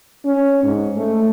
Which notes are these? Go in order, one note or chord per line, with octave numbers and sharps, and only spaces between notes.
C#4
G#2
A3